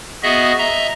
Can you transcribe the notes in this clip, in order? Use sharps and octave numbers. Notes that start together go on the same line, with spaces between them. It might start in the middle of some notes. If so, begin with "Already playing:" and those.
B3 F#4 G#4 D#5 E5
D#5 E5 A#5